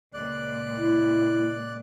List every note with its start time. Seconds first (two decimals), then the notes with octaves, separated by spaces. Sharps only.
0.14 C#2 A#2 D5 F#6
0.77 E4